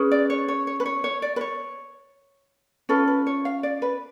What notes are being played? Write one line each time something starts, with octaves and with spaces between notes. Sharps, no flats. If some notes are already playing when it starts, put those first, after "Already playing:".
Already playing: C#4 G#4 B4
D5
C#5
C#5
C#5
B4
C#5
C#5
D5
B4
C#5
C#4 F4 A4 B4
B4
C#5
F5
D5
B4